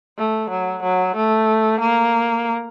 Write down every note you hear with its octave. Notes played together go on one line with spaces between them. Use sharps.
A3
F#3
F#3
A3
A#3